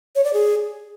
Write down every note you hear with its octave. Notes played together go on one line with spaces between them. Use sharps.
C#5
D5
G#4